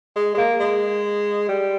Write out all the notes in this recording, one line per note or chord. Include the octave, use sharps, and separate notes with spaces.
G#3
G#3
A#3
G#3
G3